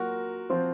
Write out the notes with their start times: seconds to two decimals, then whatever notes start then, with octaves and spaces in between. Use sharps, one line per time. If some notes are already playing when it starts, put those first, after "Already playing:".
Already playing: F#3 A#3 F4 F#4 A#4
0.50 F3 C4 F4